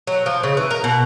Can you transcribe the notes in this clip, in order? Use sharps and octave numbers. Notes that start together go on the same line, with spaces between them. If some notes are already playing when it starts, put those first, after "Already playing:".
F#3
F3
C#3
E3
A#4
B2